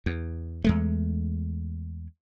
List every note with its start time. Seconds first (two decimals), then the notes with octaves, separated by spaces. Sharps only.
0.06 E2
0.64 E2 G#3 A3